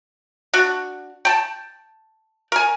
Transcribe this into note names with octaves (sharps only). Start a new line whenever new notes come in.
D4 F#4
G5 A5
A#4 G#5